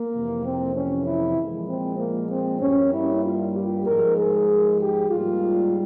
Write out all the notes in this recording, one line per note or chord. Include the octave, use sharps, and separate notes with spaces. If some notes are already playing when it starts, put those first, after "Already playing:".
Already playing: A#3
F2 C3 E3
C4
C#4
E4
A#2 F3 G#3
C4
A#3
C4
G2 G3 A#3 C#4
E4
F4
G4
G#2 F3 G#3 A#4
G#4
G4
G#2 G3 A#3 F4